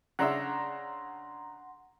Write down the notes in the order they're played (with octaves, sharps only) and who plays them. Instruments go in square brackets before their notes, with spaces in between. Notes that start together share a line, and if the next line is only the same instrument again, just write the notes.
[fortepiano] C#3 D4 E5 [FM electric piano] F#5 A#5 C6